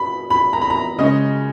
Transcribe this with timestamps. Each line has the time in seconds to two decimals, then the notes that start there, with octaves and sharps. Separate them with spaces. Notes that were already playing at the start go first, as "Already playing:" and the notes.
Already playing: B2 B5
0.30 B5
0.53 A#5
0.61 B5
0.70 A#5
0.98 C#3 G#3 C#4 D#5